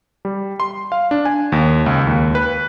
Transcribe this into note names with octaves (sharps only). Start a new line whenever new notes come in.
G3
C6
F5
D4
G#5
D#2
C#2
D#2
B4